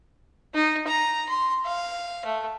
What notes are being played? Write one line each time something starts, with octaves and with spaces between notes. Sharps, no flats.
D#4
A#5
C6
F5
A3